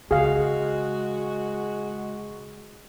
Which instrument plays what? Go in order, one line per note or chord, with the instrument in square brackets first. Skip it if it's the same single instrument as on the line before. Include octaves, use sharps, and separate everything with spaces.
[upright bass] C#3 [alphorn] G#3 [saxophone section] F#4 [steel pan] G#4 F5